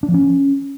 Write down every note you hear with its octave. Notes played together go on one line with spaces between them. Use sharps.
D4
F3
C#4